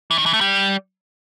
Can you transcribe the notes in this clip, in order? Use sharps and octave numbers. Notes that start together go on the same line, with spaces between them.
E3
D#3
E3
A3
G3